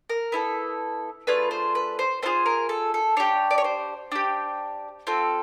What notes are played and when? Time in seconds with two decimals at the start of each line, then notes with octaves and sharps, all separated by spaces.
0.09 A#4
0.32 B3 E4 A4
1.27 A3 D4 F4 G#4 B4
1.51 C5
1.75 B4
1.99 C5
2.22 A3 D4 F4 G#4 C5
2.46 A#4
2.69 A4
2.94 A4
3.17 D4 G4 C#5
3.51 D5
3.58 C#5
3.64 C5
4.12 D4 G4
5.07 C4 F4 A4